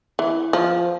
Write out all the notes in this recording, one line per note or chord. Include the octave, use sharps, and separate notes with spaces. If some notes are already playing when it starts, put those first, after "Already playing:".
E3
F3